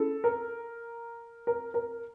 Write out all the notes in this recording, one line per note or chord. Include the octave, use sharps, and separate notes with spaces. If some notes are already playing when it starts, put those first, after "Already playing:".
Already playing: C#4 E4 G#4 A4
A#4
A#4
A#4